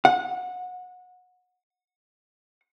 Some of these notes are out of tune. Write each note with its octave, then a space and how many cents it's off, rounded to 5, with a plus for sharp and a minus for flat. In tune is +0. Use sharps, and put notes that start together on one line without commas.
F#5 -25